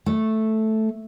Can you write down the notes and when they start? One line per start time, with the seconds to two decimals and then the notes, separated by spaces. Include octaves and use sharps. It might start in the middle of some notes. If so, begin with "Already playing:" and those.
0.06 A3